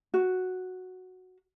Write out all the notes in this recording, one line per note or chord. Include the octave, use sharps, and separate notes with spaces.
F#4